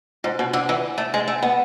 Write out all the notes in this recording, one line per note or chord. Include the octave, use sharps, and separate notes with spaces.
G#2
B2
D3
E3
A3
G#3
A3
B3